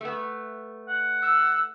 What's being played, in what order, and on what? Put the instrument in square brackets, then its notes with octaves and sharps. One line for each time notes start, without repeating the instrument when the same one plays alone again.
[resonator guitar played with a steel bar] A3 B3
[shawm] F#5
[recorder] E6